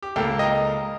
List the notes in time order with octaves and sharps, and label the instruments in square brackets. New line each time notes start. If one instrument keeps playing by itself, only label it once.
[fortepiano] G4
[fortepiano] C#2 A#3 F5 [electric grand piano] A4 G5
[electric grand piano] D#5 A#5